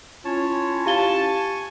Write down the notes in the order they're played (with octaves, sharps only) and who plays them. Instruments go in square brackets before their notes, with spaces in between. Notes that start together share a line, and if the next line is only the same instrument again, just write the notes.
[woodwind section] C#4 E4 F4 [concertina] C#5 A5
[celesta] G4 F5 G7 [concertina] G#5 C#6 [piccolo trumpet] A5